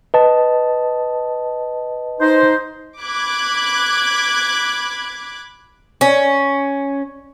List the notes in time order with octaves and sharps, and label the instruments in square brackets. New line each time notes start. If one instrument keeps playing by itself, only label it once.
[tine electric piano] B4 D#5 A5
[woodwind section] D#4 C5
[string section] B5 D6 F#6 G#6
[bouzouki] C#4